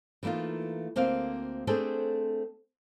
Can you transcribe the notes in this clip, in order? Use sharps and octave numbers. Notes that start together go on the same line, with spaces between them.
E3 A3 A#3 D#4 F4
D2 A#3 C4 C5 F5
A3 C4 D4 G#4 A4 C5